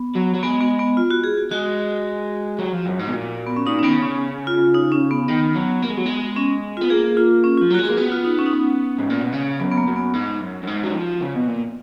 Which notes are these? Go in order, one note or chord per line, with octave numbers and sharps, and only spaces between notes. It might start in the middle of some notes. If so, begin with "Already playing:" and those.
Already playing: B3
F#3
F#3
G#3 B3
B3
B3
F4
F#4
G#4
F#4
G#3 F#4
F#3
F3
F#2
G#2
B2
A#2
B3
C#4
A#2 D#4
C#4
D#3 B3
C#3
C#4
F4
D#4
C#4
B3
D#3
F#3
A#3
G#3
F#3
G#3
C#4
B3 F4
A#3 G#4
F4
C#4
F3 F4
F#3
G#3 F#4
A#3 G#4
B3 F#4
F4
D#4
C#4
D#4
C#4
G#2
A#2
B2
C#3
F#2 B3
B3
A#3
F#2
B3
G#2
F#2
F#2
G#2
F#3
F3
C#3
B2
A#2